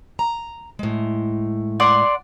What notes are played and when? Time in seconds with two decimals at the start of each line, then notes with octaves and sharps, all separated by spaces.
0.19 A#5
0.79 A2 G#3
1.80 D5 F#5 C6